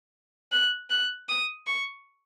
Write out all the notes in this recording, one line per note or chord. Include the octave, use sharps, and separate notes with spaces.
F#6
F#6
D#6
C#6